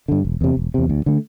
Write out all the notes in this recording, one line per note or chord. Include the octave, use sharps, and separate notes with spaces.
G2 D3
E1
E2 C3
E1
E2 C3
D2
D3 A3